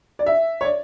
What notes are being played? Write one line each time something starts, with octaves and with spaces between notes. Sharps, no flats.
D5
E5
C#5
D5